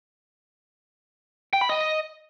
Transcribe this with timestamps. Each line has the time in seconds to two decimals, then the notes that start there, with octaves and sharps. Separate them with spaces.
1.53 G5
1.61 B5
1.69 D#5